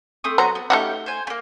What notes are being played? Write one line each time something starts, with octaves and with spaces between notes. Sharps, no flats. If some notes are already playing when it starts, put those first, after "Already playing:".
A3 C4 D#6
F#3 B3 F#4 C5 A#5
B3
A3 C#4 D#4 F#4 G4 C#6
C5 G#5
A3 A#3